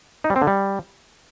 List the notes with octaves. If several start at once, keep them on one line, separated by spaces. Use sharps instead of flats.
D#4
G3
C4
D3
G3